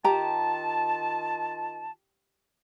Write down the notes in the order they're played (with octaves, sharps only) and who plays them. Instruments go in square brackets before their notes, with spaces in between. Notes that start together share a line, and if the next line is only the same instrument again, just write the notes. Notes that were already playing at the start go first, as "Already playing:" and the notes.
[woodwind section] D#3 F4 A5 [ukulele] G4 A#5